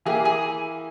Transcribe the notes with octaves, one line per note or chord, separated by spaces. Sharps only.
E3 A#3 E4 G4 G#4
G#4